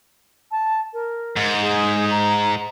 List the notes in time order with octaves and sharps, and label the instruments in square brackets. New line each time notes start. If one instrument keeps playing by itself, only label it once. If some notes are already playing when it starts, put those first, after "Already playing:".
[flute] A5
A#4
[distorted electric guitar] G#2
[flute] G#4
A#5